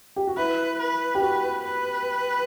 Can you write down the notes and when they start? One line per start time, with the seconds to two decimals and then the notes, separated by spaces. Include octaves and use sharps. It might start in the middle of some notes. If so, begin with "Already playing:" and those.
0.16 G4
0.27 F#4
0.37 E4 B4
0.80 B4
1.15 G4
1.22 F#4 B4
1.65 B4